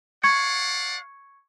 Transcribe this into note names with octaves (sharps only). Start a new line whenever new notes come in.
D5 F5 F#5 C#6 G#6 C#7